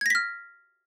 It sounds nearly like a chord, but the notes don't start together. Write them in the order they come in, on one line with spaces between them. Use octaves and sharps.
G#6 A#6 B6 F6